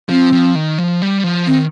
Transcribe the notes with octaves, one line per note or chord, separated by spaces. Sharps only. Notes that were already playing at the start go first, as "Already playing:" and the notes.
F3 C4
F3
D#3
F3
G3
F3
D#3 C4